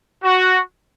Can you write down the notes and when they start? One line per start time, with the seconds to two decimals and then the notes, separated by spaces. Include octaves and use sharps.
0.24 F#4